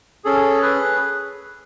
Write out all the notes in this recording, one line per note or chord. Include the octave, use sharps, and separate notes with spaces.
C#4 G#4 A4
G#4 B4